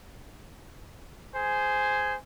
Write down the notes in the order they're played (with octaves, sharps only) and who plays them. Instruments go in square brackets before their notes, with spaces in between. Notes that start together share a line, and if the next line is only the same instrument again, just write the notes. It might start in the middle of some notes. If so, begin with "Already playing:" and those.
[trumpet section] G#4 C5 G#5